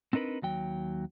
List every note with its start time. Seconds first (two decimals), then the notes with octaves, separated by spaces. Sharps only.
0.13 C4 D4 D#4 A#4 B4
0.42 D#2 F#3 G5